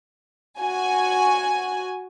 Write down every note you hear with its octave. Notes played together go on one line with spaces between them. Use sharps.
F#4 G#5